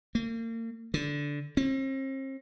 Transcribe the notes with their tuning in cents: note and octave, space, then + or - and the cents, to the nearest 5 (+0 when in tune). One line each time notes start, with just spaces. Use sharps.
A#3 -40
D3 -10
C4 +40